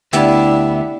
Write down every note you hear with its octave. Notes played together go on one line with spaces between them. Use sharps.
D2 B3 D4 E4 G4 E5